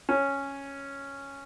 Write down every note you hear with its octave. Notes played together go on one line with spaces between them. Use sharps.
C#4